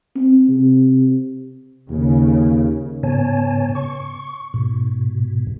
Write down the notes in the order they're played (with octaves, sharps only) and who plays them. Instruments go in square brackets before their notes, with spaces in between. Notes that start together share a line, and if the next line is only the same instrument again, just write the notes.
[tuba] C4
C3
[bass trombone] D#2 [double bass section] C#3
[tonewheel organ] G#2 C#3 B3 C#5 G#5 A5
C#6
G#2 B2